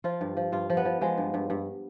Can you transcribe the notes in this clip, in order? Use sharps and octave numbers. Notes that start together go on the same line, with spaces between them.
F3 F4
G2
F3
G2 F4
F3
B3
F3
F3 G#3
G2
G2
G2